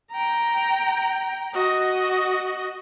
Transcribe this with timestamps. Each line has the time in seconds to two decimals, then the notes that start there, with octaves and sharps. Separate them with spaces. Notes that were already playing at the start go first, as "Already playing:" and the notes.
0.11 G5 A#5
1.54 F#4 D#5